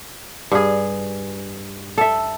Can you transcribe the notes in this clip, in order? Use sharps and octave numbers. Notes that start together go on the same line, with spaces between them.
G2 G#4
A4 E5